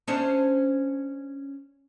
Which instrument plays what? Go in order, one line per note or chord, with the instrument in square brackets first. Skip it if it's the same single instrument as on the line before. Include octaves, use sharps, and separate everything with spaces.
[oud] C#4 D4 C5